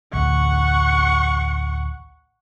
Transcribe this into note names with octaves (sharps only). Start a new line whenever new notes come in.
A1 D2 F#5 C#6